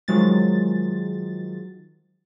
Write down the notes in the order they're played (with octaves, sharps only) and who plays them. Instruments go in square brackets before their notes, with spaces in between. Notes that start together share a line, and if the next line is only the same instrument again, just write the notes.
[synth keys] D#3 F3 F#3 G#3 A6